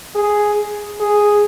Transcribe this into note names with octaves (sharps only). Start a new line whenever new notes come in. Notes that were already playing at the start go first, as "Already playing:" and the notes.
G#4
G#4